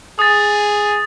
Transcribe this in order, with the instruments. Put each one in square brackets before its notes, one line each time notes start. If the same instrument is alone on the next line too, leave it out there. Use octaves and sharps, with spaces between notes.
[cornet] G#4 [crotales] D#6 A6